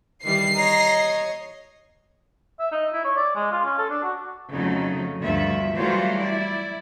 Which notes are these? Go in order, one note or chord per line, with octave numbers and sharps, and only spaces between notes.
D#3 E3 G3 C7
C#5 D#5 A#5
E5
D#4
E4
C#5
D5
G#3
F4
C#4
A4
D4
F#4
F2 C#3 F#3 A3 D#4
D2 G2 F3 A3 E5
E3 F#3 G3 A3 F4 C5
E4 D5